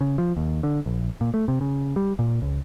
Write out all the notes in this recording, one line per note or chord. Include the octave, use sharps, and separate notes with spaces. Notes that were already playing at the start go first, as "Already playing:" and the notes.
C#3
F3
D#2
D3
A#1
A#2
A3
C3
C#3
G3
A#2
C#2